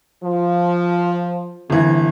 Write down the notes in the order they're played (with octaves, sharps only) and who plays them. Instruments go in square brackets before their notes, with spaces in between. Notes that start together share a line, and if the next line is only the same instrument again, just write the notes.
[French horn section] F3
[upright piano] G1 E3 [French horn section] C3